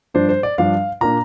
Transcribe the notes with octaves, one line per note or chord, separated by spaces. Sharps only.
G2 F3 D4 C5
C5
D5
G2 F3 D4 F5
A#2 A#3 D4 A#5